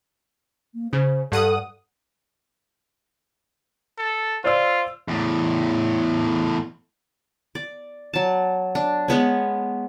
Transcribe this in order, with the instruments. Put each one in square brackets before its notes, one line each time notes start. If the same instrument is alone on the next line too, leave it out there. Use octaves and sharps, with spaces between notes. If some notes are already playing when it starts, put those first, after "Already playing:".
[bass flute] A#3
[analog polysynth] C#3 [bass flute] C5
[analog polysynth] G2 F#5 D#6 [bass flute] A4
[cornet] A4
[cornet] F4 [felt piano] C5 D5 E6
[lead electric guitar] E2 A2
[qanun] D5
F#3 A5
D4
G#3 B3 C#4